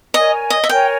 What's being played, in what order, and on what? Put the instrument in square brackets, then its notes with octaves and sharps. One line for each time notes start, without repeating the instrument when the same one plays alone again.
[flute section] A#4 C#5 G#5 [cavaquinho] D#5
[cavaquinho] D#5
E5
[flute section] A#4 C#5 G#5 [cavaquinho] G5